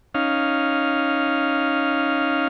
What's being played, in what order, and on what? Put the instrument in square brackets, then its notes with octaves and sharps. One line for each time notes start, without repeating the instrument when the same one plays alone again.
[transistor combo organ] C#4 D#4 F5